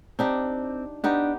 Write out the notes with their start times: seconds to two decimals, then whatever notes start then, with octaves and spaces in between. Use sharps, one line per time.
0.19 C4 D4 D#4 G4
1.04 B3 D4 D#4 G4